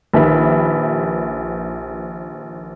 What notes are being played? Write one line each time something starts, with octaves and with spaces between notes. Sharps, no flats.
A#1 D#3 G4 B4 E5 B5